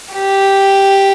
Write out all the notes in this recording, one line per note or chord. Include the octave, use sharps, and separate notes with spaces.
G4